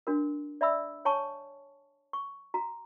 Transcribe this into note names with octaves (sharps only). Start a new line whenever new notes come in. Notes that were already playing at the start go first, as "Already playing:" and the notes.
D4 F#4 A#4
D5 E5 B5 E6
C#5 G#5 A5 C#6
C#6
F#4 A#5